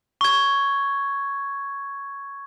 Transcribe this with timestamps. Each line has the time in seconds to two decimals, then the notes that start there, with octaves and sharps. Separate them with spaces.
0.21 C#6 G#6